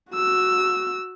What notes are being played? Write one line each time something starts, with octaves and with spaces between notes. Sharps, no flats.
F#4 E6